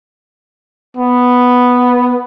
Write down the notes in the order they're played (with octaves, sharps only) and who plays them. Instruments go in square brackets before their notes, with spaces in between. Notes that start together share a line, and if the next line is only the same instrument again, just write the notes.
[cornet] B3